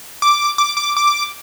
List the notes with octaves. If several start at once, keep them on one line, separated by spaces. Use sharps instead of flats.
D6
D6
D6
D6